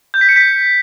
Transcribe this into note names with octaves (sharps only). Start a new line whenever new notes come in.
G6
B6
C#7
B6